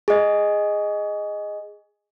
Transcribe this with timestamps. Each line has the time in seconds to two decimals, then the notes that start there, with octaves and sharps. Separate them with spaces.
0.08 G#4 D#5